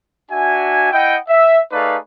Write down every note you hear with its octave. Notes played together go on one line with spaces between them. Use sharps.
D4 F#4 E5 G#5
E4 D#5 F#5 G5
E5
A3 D#4 G#4 B4 D5 F5